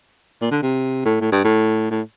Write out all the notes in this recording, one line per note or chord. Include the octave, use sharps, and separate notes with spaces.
A#2
D3
C3
A2
A2
G2
A2
A2